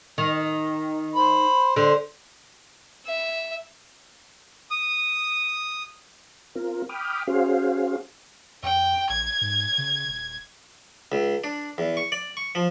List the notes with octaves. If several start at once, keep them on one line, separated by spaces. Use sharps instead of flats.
D#3
C5 B5
D3 C5
E5
D#6
C4 F4 A#4
G5 B5 D6 D#6 F6
C#4 F#4 G#4 C5 F5
F2 G5
A#1 G#6
G#2
C#3
D#1
C#2
D4
E2
C#6
D5
C#6
F3